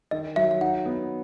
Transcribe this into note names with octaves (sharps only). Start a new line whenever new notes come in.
D#3 D#5
F#3 E5
E5
D#4 F#5
B3